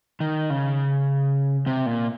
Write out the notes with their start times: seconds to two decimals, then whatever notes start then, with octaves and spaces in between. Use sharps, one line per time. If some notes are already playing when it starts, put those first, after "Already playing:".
0.20 D#3
0.50 C#3
1.67 C3
1.86 A#2